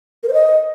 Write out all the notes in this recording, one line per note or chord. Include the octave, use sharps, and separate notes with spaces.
A#4
C5
D#5